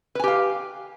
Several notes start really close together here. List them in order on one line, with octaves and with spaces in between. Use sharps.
B4 G#5 G4 F5